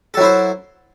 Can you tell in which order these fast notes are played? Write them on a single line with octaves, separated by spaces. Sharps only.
A4 F#3 E4 C5